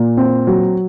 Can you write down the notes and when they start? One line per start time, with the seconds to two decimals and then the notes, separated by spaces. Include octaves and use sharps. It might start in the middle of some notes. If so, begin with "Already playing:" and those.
Already playing: A#2
0.17 C4
0.47 F#3